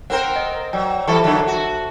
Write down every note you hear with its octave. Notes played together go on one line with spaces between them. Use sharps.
C4 A#4 C5 F#5 G5
D#5
F#3 D5 G5
E3 G3 A4 E5 A5 C#6
D3 F#3 D4
F#4